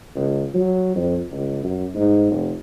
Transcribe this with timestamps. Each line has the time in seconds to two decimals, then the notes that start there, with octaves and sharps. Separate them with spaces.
0.16 C#2
0.54 F#3
0.96 F2
1.31 C#2
1.63 F#2
1.94 G#2
2.31 F1